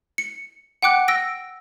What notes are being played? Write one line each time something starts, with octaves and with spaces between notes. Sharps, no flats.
C#7
F#5 G5 D6 F#6
E6 A#6 D7